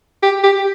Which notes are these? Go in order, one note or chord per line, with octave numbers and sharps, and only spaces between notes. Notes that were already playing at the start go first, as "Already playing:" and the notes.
G4
G4